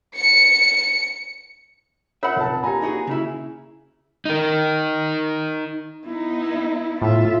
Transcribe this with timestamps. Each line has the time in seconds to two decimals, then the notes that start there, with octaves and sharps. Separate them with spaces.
0.16 C#7
2.23 F4 A#4 C#5 E5 F#5
2.36 F1 A5
2.63 A#3 F4 G4 G#5 A#5
2.82 D#4 F#4 G#4
3.07 C#3 E4
4.25 D#4 A#4
6.06 B3 D#4 E4
7.02 A2 F4 E5